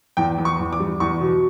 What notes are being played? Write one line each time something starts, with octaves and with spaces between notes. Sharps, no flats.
E2 G5
E2
C#6
E2
D6
G3
E2 C#6
B2